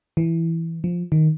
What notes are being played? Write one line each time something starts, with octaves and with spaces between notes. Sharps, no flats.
E3
F3
D#3